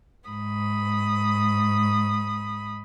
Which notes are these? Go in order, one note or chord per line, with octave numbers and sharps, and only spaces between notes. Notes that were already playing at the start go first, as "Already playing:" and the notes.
G#2 B5 D#6